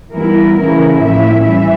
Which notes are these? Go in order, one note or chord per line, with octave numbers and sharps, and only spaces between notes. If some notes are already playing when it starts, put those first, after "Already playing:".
E3 G3 B3 E4 A#4
C#3 E3 A3 C#4 E4
A2 F3 A#3 C#4 E4 E5
E3 G3 E5